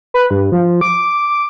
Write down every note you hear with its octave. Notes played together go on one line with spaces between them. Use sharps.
B4
G2
F3
D6